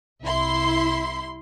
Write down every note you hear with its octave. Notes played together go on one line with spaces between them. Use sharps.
C2 E4 C6